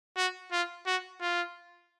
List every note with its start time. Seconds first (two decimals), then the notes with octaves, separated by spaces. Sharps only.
0.17 F#4
0.52 F4
0.86 F#4
1.21 F4